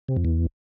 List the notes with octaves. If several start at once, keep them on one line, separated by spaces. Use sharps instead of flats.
C3
F2
E2